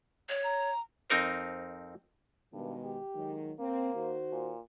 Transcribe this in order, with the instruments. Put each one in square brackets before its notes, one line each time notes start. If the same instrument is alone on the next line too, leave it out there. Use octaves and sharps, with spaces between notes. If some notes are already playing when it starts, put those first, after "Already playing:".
[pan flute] C#5
[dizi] A#5
[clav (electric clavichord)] F2 C4 D#4 A#4 C5
[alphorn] G2 [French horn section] B2 D#3 G#3
[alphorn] G4
[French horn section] D#3 F#3 G#3
[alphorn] A#3 [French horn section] C4
[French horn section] D#3 F#4 C5
[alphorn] A#2